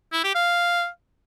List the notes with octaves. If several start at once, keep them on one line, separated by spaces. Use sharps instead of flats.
E4
G4
F5